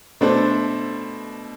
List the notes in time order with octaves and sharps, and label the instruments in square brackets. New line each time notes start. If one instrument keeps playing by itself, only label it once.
[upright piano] B2 A3 D4 A4 C5